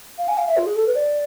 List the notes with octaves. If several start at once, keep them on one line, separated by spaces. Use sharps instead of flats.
F5
G#5
F5
E5
F4
G#4
A4
B4
D5